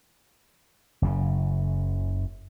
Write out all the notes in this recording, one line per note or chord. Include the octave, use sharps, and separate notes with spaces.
F#1 F#2 C#3